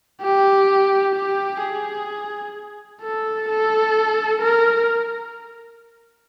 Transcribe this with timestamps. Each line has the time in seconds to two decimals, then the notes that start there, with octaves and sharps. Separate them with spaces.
0.22 G4
1.15 G4
1.62 G#4
3.02 A4
3.48 A4
4.42 A#4